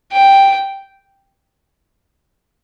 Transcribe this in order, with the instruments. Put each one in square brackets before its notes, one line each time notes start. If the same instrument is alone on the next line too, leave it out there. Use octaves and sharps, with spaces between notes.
[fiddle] G5